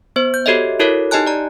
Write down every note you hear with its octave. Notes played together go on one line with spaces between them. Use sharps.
B3 C5
G6
F#4 G4 A4 C#5 D#5 E5
E4 F#4 A4 A#4 C#5
D#4 G4 D#5 G#5 A5 F#6
D5 A#5